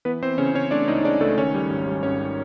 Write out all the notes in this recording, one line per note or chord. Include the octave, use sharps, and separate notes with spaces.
E3 B3 B4
E3 C4 C5
C#3 C#4 C#5
C#3 C#4 C#5
A3 D4 D5
C#2 D#4 D#5
C#3 D4 D5
C#2 A3 A4
D#3 C#4 C#5
G3
G#1
G3
G#1 C#4 C#5